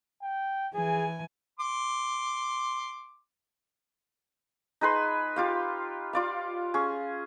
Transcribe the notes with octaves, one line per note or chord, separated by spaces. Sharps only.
G5
E3 G#4 G#5
C6 D6
D#4 G#4 B4 C6
F4 G4 F5
F4 D5 F5
C#4 G#4